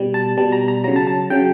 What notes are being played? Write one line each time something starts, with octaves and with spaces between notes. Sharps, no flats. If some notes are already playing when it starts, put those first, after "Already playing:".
Already playing: B2 G3
A5
B2 G3 A5
A#5
A#5
C#3 F#3 A#5
A5
A5
C#3 F#3 G5